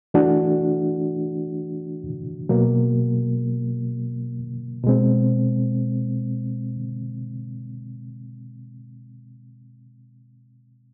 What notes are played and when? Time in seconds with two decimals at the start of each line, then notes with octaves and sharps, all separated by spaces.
0.14 E3 A3 D4 F#4
2.49 B2 F#3 A#3
4.84 B2 G#3 C4